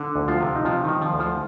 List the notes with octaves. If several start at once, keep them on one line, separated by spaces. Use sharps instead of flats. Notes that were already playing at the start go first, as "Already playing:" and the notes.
Already playing: D3
D2
F3 F4
C3
D#4
C3 F3 F4
D#3 D#4
F3
F3 F4
D2
F3 F4